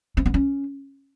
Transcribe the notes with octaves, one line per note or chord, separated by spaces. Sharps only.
C4
B3
C#4